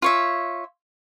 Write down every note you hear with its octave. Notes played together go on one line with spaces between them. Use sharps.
F4 C#5 E5